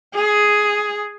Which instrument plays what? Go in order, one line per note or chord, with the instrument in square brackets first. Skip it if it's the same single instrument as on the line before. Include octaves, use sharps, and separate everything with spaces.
[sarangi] G#4